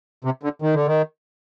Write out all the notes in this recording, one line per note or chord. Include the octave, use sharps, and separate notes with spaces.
C3
D3
D#3
D3
D#3